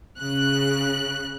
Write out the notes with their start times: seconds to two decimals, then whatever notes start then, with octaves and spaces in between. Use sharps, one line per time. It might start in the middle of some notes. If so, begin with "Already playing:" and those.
0.19 C#3 F#6